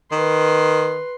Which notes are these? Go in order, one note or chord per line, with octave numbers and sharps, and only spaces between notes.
D#3 B4 C6